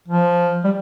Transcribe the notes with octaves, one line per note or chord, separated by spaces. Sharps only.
F3
G3